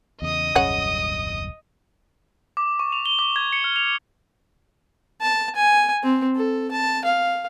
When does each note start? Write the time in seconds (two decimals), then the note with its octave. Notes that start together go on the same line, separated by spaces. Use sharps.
0.22 E2 C#3 D#5 D#6
0.56 D#1 C2 F#2 C#3 C#5 F#5
2.57 D6
2.79 C#6
2.92 F7
3.06 G7
3.19 D6
3.36 G#6
3.53 C#7
3.64 F6
3.76 F7
5.21 A5
5.55 G#5
6.03 C4
6.36 A4
6.71 A5
7.05 F5